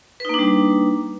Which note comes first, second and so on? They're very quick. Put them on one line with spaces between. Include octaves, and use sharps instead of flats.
B4 D#4 A#3 D4 G3